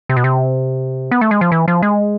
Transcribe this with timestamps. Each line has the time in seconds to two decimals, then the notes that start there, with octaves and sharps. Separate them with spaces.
0.09 C3
0.17 B2
0.24 C3
1.11 B3
1.21 A3
1.31 G#3
1.41 F3
1.52 E3
1.68 F3
1.82 G#3